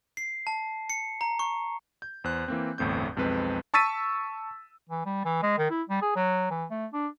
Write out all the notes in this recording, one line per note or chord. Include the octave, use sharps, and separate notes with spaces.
C7
A5
C#7
A#5
C#6
G6
E2 C5 F#6
E3 A#3 C4
G1 E2 A2 C4 G6
B1 F2 G#3 C4 B4
A5 C#6 E6 A6 B6 D#7
E3
G3
E3
G#3
D#3
E4
G3
G#4
F#3
E3
A3
D4